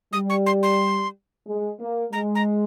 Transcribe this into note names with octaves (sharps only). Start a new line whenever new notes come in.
G3 D#6
C#6
C6
C6
G#3
A#3
G#3 A#5
A#5